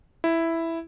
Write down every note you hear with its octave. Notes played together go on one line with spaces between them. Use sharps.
E4